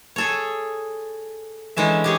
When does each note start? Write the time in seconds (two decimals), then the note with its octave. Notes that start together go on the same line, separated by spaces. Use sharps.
0.16 G#4 A4 C#5
1.76 D3 E3 G#3 C#4 E5
2.04 G4 G#4 C#5